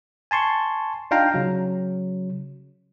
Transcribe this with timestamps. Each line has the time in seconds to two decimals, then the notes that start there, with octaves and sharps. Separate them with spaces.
0.31 G#5 A5 C6 C#6
1.11 D4 D#4 F4 F5 G5 A#5
1.34 C#3 F#3